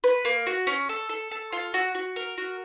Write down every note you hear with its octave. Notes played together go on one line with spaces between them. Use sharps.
B4
A#3
F#4
C#4
A4
A4
A4
F4
F#4
F#4
A#4
F#4